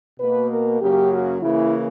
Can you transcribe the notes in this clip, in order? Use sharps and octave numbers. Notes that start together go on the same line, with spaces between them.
B2 A#3 B4
A#4
F#2 C#3 F#3 A#3 G4
F#4
C#3 E3 A#3 E4